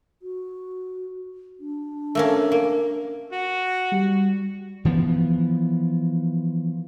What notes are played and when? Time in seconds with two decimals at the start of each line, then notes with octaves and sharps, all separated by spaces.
0.22 F#4
1.60 D4
2.15 A3 A#3 C#4
2.52 A#3
3.32 F#4
3.92 G3
4.85 E3 F3 A3 B3